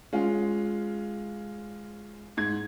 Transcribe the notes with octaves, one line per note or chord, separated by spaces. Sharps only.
G#3 C#4 F4
G#2 G#6